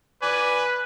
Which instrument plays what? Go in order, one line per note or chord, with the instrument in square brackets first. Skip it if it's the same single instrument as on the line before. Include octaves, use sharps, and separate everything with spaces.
[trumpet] B4 [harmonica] D5 G#5